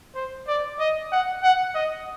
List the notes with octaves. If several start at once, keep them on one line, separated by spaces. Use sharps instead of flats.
C5
D5
D#5
F#5
F#5
D#5